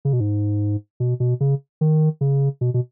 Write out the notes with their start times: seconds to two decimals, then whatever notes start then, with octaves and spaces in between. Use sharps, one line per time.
0.05 C#3
0.13 B2
0.20 G#2
1.00 B2
1.20 B2
1.40 C#3
1.81 D#3
2.21 C#3
2.61 B2
2.74 B2